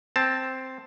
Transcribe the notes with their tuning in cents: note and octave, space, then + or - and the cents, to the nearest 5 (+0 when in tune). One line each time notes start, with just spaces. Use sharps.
C4 +0 A5 +0